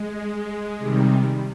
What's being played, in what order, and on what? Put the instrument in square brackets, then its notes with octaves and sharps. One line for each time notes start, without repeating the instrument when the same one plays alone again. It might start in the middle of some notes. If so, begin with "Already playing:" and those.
Already playing: [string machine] G#3
C3 D#3 G3